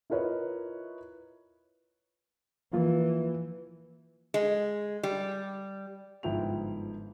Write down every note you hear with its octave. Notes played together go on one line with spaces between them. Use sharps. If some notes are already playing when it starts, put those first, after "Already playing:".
E4 F4 A#4 B4 C#5 D#5
E3 F3 A#3 F4
G#3
G3
G1 G#2 F3 E4 G5 F7